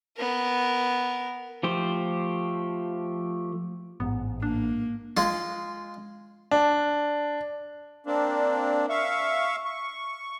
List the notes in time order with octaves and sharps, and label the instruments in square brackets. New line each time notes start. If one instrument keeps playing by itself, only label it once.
[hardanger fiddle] B3 A#4
[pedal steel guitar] F3 A3 G4 C5
[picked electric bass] A1 G#2 [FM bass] B3
[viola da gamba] A#3 [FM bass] D4
[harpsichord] G#3 F4
[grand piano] D4
[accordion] A#3 C4 D4
E5 F5 C#6
C#6